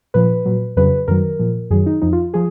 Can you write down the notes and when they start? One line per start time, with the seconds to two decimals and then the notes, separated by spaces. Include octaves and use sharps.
0.14 A#2 F3 B4
0.45 A#2 F#3
0.76 F2 C#3 F#3 B4
1.08 F#2 D#3 F#3 A#4
1.39 A#2 F3
1.70 F#2 D#3 F#3 G#4
1.86 D#4
2.02 F2 F3 D#4
2.13 F4
2.34 F3 G#4